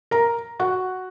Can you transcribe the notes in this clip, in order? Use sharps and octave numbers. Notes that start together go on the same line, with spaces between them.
A#4 A#5
F#4 F#5